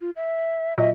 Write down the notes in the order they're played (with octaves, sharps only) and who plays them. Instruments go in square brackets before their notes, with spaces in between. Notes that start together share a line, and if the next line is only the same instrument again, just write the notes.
[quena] F4
E5
[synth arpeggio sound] A#2 F#3 [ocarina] D#5 [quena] E5